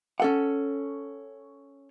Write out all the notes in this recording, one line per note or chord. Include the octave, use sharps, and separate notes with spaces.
C#4 A4 F#5